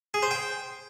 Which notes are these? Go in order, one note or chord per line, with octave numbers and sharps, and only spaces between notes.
G#4
C5
G5